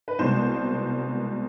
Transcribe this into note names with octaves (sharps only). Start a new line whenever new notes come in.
B4
C2 B2 G#3 C5